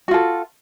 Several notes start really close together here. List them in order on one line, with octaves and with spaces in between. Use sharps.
F#4 F4 A4